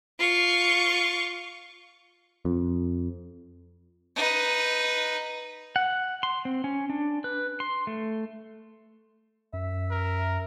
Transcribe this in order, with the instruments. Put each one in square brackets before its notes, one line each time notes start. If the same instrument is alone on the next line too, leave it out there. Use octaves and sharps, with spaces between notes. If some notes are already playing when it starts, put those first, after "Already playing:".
[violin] F4 C#6
[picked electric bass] F2
[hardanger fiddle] D#4 B4
[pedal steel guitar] F#5
C6
C4
C#4
D4
B4
C6
A3
[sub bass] F#2 [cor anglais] E5
[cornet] A#4